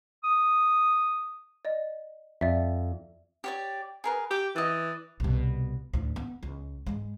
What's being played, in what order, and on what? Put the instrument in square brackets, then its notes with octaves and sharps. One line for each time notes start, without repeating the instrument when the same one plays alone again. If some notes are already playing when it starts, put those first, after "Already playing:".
[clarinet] D#6
[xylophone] D5 D#5
[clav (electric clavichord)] F2 [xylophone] D5 E5
[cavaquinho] G4 C#5 D5
G#4 A#4 B4
[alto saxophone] G4 [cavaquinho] D6
[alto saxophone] E3 [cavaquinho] D5 D#5
[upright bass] C2 B2
D2 A2
B3
C#2
G#2 G#3